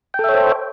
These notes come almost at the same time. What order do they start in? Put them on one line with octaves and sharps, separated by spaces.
G5 A4 E5 C#5 C5